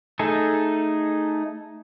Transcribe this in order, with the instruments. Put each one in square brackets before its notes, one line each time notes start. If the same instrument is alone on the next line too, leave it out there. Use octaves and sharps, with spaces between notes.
[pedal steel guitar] A3 D#4 G#4 A4